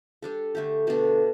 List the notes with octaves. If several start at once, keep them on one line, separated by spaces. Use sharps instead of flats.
G3 D4 A4
D3 A3 G4
B2 A3 D4